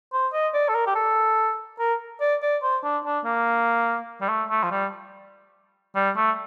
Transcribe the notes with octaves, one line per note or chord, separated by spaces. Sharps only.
C5
D#5
D5
A4
A#4
G4
A4
A#4
D5
D5
C5
D4
D4
A#3
G3
A3
A3
F3
G3
G3
A3